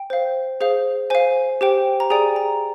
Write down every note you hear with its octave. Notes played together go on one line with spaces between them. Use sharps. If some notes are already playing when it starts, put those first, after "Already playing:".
Already playing: G5
C5 F5
G#4 C5 F5
C5 F5 G#5
G4 C5 G5
A#5
G#4 D5 G5 G#5
A#5